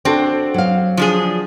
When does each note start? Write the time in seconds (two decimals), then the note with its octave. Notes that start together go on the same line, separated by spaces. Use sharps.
0.05 C4 D4 F#4 A4
0.54 F#3 F5
0.97 F3 D4 G#4